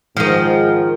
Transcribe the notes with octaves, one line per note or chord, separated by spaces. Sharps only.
G#2 D#3 F3